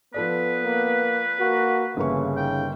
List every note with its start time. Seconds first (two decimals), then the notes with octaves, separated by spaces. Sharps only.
0.14 F3 B3 A4 B4 D5
0.63 A#3
1.40 A#3 F#4
1.97 G1 C#3 E3 A#3 C#6
2.37 D#3 G5